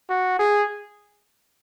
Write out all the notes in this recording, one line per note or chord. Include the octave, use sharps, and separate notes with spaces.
F#4
G#4